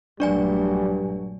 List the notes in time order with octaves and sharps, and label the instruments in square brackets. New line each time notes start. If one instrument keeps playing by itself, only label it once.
[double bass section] A#1 F#3 A3 [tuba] G2 [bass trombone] G3 [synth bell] D4 D5 G#5